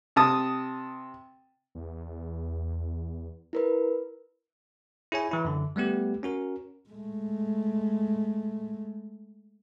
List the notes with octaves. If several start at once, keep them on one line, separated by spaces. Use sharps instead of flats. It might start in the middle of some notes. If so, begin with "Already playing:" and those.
C3 A5 D#6
E2
E4 A#4 B4
E4 G#4 C#5 G#5
E3 E4
F#2 D3
G3 A3 B3 G4
C#4 F#4 A#4
G#3 A3